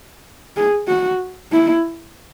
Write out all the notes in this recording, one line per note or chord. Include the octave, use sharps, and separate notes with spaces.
G#4
F#4
E4